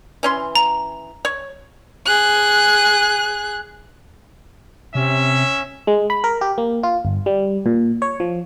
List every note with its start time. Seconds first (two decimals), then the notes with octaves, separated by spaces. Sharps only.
0.23 E3 C#4 C6
0.55 A#5
1.25 C#5
2.05 G#4 F#6
4.95 C3 C#4 E5
5.87 G#3
6.10 B5
6.24 A#4
6.41 G4
6.58 A#3
6.83 F4
7.05 G1
7.26 G3
7.66 A#2
8.02 C#5
8.20 F3